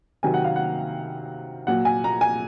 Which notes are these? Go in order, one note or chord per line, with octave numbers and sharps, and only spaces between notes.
C3 D#3 F#3 G#5
F#5
F5
F#5
A#2 F#3 F#5
G#5
A#5
G#5